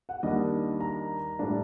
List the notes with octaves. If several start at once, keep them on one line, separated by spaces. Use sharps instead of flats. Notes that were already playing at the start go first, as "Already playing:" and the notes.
F#5
D#2 D#3 G3 D4 D#5
A#5
A2 G3 D4